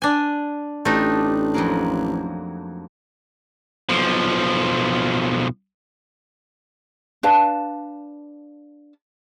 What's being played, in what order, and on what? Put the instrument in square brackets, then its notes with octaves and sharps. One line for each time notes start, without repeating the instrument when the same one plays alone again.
[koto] D4 G#5
[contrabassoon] A1 [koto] A3 D#4 [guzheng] D4 G4
[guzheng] F2 F#3 A#3
[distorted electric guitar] B1 F3
[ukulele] D4 B4 F5 A5